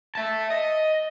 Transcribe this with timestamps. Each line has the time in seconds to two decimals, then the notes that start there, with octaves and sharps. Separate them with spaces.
0.15 E5 A5
0.50 D#5